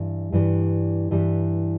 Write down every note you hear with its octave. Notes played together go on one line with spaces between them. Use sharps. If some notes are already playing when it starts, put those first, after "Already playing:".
Already playing: G2 E3 G3
G2 E3 G3
G2 E3 G3